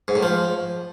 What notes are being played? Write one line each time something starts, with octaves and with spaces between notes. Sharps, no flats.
G#2
A2
F3